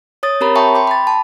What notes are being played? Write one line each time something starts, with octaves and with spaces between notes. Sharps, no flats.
C#5 D#6 A6
C4 G4 A#4 C#5 A#5 B5
E5 G5 A5 B5 C#6
G5 C6 D6
B5 A6
A5